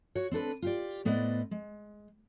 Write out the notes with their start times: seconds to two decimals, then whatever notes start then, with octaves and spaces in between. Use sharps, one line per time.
0.15 F#4 C#5
0.31 C4 D4 A4 B4
0.62 F4 G4 D5
1.05 A2 B3 B4 C5 D5 D#5
1.51 G#3